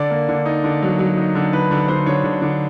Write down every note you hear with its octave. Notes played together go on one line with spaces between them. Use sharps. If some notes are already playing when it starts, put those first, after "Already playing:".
Already playing: D3 D5
A#3
D3
D#4
D3
F#3
F#3
D#4
D3
D3 B4
D3
D3 C5
D3 C#5
D3
D3